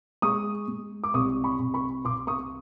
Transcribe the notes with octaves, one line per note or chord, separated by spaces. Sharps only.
G#3 C#6 D#6
G#3
D6
C2 C#6 D#6
B5 C#6
C2
B5 C#6
C2 C6 D6
C#6 D#6